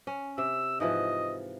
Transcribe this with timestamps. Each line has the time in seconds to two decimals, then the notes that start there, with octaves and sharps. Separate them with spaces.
0.07 C#4
0.38 C3 E6
0.80 G#2 E3 F3 D#5